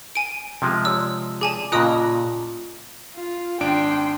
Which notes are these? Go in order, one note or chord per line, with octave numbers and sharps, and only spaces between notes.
G#5 D7
C3 F3 G#3
G4 C#5 D5 E6
G#4 D5 G#5 A5 D6
A#2 C#3 F4 A#4 D#5 A5 D#6 F#6
F4
G#1 D4 G5 C6 D7